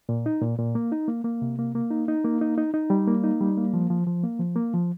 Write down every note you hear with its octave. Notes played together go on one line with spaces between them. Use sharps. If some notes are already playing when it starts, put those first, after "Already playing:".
A#2
D#4
A#2
A#2
A#3
D#4
A#3
A#3
C3
A#3
A#3
D#4
D#4
A#3
D#4
D#4
D#4
G3
A#3
D#4
G3
A#3
F3
F3
F3
A#3
F3
A#3
F3